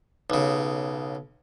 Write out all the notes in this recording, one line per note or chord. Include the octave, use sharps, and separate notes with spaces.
B1 C#3